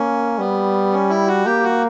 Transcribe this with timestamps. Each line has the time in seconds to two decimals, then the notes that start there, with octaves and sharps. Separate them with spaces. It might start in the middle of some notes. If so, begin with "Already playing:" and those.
Already playing: A#3 C#4
0.39 G3 B3
0.93 C#4
1.09 E4
1.28 F#4
1.46 A#3 G4
1.64 F#4